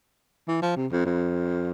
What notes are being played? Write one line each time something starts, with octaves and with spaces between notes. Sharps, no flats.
E3
F3
C3
F2
F2